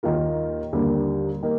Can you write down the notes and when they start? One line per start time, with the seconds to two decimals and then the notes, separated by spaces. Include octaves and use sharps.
0.03 D#2 D#3 A#3 F4 A#4
0.73 D#2 D3 G3 A#3
1.43 D#3 A#3